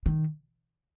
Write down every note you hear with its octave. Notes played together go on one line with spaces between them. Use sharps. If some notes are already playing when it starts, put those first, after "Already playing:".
D#3